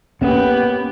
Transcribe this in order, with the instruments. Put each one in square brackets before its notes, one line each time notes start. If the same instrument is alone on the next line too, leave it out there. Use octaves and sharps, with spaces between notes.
[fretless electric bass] A#3 C#4 [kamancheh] B3 G4